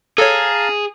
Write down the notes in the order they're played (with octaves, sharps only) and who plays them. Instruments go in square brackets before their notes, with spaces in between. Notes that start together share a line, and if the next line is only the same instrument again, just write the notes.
[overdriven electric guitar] G#4 [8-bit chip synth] A4 C#5 [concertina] F5 A5 A#5